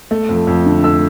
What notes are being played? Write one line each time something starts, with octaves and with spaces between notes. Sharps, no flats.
A3
F2
F2
D3
A3 E6